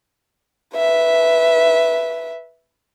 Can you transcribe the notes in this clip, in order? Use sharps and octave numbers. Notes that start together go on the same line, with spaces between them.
B4 E5